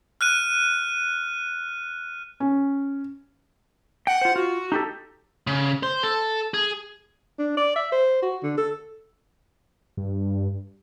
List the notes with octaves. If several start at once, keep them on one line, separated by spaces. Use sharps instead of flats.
F6 F#6 D#7
C#4
F#5 G5
F4 C5
F4 F#4
D#4 G4 A4
C#3
C5
A4
G#4
D4
D5
E5
C5
F#4
D3
A4
G2